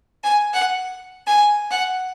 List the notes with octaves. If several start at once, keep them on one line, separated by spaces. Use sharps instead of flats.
G#5
F#5
G#5
F#5